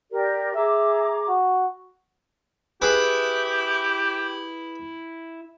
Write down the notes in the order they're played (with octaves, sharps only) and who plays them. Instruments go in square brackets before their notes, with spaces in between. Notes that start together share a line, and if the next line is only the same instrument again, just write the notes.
[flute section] G4 A#4 D5
[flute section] G#4 A#5 D6 [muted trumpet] E5
[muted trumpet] F#4
[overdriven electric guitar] E4 [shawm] G4 [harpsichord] G#4 B4